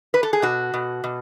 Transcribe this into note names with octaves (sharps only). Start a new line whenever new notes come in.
B4
A4
G#4
B2 F#4
B2
B2